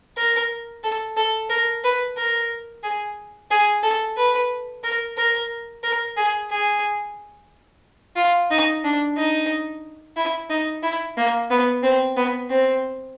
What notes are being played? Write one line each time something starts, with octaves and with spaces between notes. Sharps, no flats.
A#4
A4
A4
A#4
B4
A#4
G#4
G#4
A4
B4
A#4
A#4
A#4
G#4
G#4
F4
D#4
D4
D#4
E4
D#4
E4
A#3
B3
C4
B3
C4